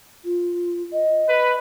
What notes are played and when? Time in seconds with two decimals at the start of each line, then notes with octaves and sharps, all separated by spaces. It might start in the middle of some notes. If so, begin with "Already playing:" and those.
0.25 F4
0.93 D#5
1.29 B4